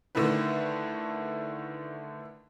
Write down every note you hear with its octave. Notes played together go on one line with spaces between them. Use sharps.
D3 D#3 A3 E4 B4